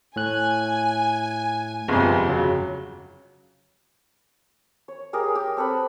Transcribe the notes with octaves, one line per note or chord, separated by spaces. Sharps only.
A2 G#5 F#6
G1 F2 C3 G#3
C#3 F#3
C#5
G4 G#4 A#4 D#5
G4
C4 A4 B4 B5